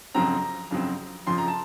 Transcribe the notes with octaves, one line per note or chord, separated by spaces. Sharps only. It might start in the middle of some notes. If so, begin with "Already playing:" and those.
F2 C#3 F#3 C4 A#5
F2 C#3 F#3 C4
F2 C#3 F3 C4 C6
A#5
A5